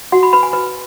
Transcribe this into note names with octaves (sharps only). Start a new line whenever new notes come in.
F#4 F#5
B5
B4 B5
G#5
B4